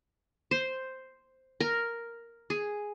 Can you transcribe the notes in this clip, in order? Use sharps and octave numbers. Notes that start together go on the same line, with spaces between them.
C5
A#4
G#4